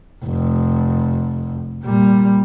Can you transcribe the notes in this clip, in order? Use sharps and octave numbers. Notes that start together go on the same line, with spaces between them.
F1
A#2 G3